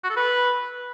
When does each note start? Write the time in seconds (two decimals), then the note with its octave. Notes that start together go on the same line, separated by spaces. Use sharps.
0.03 F#4
0.10 A4
0.16 B4